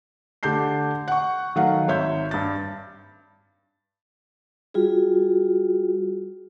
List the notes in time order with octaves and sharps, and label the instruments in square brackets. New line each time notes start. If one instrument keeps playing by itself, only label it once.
[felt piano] D3 A3 G4 A5 G6 C7
F#5 C#6
D#3 F#3 A3 F5 F#5
G#1 C#5 E5 G6
G2 A6
[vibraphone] G3 F4 F#4 G#4